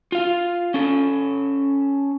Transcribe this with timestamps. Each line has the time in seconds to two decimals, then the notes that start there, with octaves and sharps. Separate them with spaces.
0.12 F4 F5
0.74 C#4 A4